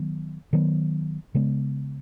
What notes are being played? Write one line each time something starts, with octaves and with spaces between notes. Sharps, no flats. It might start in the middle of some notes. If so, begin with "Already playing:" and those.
Already playing: D#3 F#3 B3
D#3 F#3 B3
C#3 G#3 B3